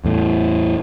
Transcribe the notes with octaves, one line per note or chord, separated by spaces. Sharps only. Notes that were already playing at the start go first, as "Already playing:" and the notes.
E2 A2